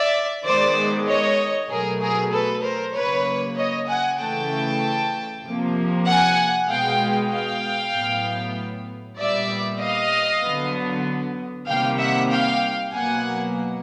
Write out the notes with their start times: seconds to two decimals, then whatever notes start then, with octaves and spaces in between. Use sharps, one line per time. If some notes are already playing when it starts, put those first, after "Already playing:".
Already playing: D5 E5
0.45 D#3 G#3 B3 C5 D5
1.07 C#5 D#5
1.69 B2 F#3 A3 G#4 A#4
2.01 G#4 A#4
2.32 A4 B4
2.63 A#4 C5
2.95 C#3 F#3 A#3 B4 C#5
3.57 C#5 D#5
3.88 F#5 G#5
4.20 C#3 E3 A3 G5 A5
5.45 C3 F3 A#3
6.07 F#5 G#5
6.68 B2 G#3 B3 F5 G5
7.31 F5 G5
7.94 A2 F#3 B3
9.18 A#2 G3 B3 D5 E5
9.80 D#5 F5
10.43 D3 F#3 B3
11.67 C3 D#3 G3 A#3 F5 G5
11.99 E5 F#5
12.31 F5 G5
12.93 B2 F#3 A#3 F#5 G#5